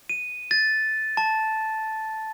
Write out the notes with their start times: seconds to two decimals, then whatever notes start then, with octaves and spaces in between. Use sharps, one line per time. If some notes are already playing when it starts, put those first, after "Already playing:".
0.09 D#7
0.51 A6
1.17 A5